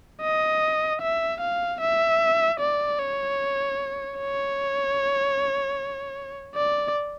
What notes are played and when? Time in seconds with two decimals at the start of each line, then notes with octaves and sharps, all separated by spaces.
0.22 D#5
1.01 E5
1.41 F5
1.81 E5
2.60 D5
2.99 C#5
4.18 C#5
6.55 D5